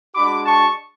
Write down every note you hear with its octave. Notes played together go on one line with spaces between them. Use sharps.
G#3 D4 F#4 B5 D6
A5 C#6